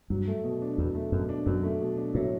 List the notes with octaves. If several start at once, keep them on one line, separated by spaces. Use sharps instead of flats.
G2 F#3
A3
B2
D4
E2 F#3
A3
F#2 B2
D4
F#2 F#3
A3
B2
D4
A2 F#3